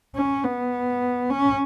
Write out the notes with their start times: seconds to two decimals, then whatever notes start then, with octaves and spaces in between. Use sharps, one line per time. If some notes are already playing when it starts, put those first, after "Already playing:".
0.16 C#4
0.44 B3
1.30 C#4